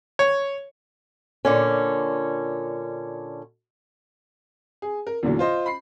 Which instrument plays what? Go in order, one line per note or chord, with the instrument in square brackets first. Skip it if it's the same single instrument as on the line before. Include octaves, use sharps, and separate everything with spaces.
[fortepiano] C#5
[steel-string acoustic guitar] A#2 D3 C#4
[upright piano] G#4
A#4
E2 A#2 D3 F#3
F4 C5 D#5
B5 C7